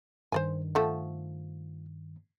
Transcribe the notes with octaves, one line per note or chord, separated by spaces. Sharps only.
G2 D#3 C5 D5 G#5
F3 A3 F#5